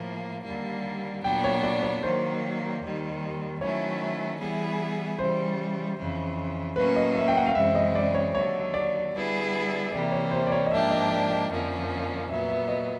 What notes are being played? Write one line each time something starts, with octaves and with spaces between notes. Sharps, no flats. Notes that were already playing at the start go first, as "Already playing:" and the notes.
Already playing: A2 F3 A#3
D#2 D3 G3 A#3
A#2 F#3 B3 D4 G5
C#5
D5
C#5
D#3 F#3 A#3 C5
D#2 D#3 G3
D#3 F#3 A3 C#4 E4 C#5
E3 G3 B3 E4 G#4
C#3 E3 G3 C5
F2 C#3 E3
A2 F#3 A#3 C#4 B4
D#5
E5
G5
F#5
F5
F#2 C#3 E3 G#3 C4 E5
D#5
D5
C#5
D#2 D3 F#3 C#5
D5
D3 G3 B3 E4 G#4
C3 E3 G3 A#3 D5
C#5
C5
D5
C#5
D#5
G#2 F3 A#3 D4 G4 E5
D#5
D5
D#5
F2 D3 F3 A#3 C#4
A#2 F#3 B3 E5
E5
D#5